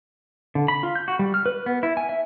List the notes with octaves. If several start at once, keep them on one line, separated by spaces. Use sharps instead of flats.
D3
B5
F4
G6
F#4
G3
F6
B4
B3
E4
G#5
E5